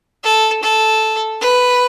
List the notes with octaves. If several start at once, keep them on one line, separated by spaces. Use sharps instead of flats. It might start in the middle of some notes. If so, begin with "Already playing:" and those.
A4
A4
B4